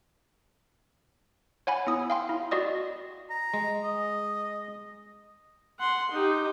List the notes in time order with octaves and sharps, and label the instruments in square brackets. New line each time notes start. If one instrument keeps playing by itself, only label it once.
[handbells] C#5 F#5 G#5 B5
B3 E4 D#6
F5 G5 C6
E4
F#4 D5 D#5 D#6
[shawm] A#5
[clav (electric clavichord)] G#3
[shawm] D#5
[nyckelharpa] F#5 C6
D#4 G4